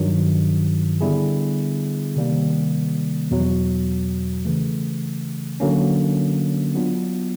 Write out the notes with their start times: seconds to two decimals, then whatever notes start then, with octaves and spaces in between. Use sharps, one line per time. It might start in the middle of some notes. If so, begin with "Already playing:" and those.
Already playing: G2 D#3 F#3
1.01 D3 G3 B3 E4 G#4
2.16 C3 D#3 G3 A#3
3.31 E2 B2 F#3
4.45 C#3 E3 A3
5.60 D3 F#3 A#3 C#4
6.75 F#3 B3 D4 F4